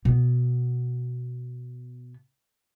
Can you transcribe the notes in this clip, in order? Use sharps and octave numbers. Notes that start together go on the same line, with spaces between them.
B2 B3